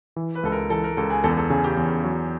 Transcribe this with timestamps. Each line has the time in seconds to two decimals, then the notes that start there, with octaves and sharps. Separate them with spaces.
0.16 E3
0.35 B4
0.43 C#2 A4
0.52 A#4
0.70 E3 A4
0.84 A#4
0.97 C#2 A4
1.10 G#4
1.24 E2 A4
1.37 A4
1.50 C#3 G#4
1.64 G4
1.77 E2
2.04 F#3